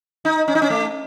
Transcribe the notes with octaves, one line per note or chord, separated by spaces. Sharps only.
D#4
C#4
D#4
C#4
A3